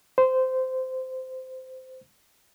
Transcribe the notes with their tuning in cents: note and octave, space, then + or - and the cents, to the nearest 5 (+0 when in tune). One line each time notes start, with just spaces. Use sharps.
C5 -15